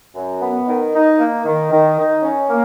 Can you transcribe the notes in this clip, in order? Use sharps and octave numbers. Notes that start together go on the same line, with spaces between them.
F#2
B3
D#3
D#4
A#3
D#3
D#3
D#4
C#4
A#3